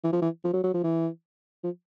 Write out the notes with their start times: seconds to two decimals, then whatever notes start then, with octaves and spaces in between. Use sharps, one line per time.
0.04 E3
0.12 F3
0.22 E3
0.44 F3
0.54 F#3
0.64 F#3
0.74 F3
0.84 E3
1.64 F3